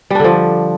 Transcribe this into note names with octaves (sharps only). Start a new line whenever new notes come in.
D3 F3 G3 D4